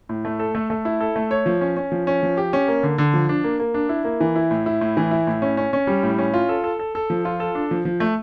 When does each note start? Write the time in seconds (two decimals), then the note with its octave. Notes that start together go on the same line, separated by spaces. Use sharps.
0.09 A2
0.25 A3
0.39 A4
0.55 A3
0.70 A3
0.85 E4
1.00 A4
1.16 A3
1.31 C#5
1.46 F3
1.61 C#4
1.77 C#4
1.92 F3
2.07 C#4
2.23 F3
2.37 G4
2.53 C#4
2.68 A#3
2.83 D3
2.98 D3
3.14 F3
3.29 D4
3.44 A#3
3.60 A#3
3.74 D4
3.89 E4
4.04 A#3
4.20 E3
4.36 E4
4.51 A2
4.66 E4
4.81 A2
4.97 E3
5.11 E4
5.27 A2
5.42 C#4
5.57 C#4
5.73 C#4
5.87 G3
6.03 A2
6.18 C#4
6.34 F4
6.49 A4
6.64 A4
6.79 A4
6.95 A4
7.10 F3
7.25 F4
7.40 A4
7.55 D4
7.71 F3
7.85 F3
8.00 A3